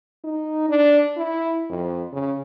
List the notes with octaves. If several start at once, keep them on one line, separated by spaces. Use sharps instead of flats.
D#4
D4
E4
F2
C#3